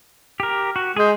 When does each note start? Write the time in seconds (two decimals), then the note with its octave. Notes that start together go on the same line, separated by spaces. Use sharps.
0.40 G4 A#4
0.76 F#4
0.97 G#3 G#4 G6